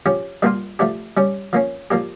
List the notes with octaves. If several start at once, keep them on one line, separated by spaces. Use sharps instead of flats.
F3 C#4 G4
A#2 G3 A#3 D4 F4
F3 A3 D4 G4
G3 C#4 G4
F3 A#3 C#4
F3 A#3 D4 G4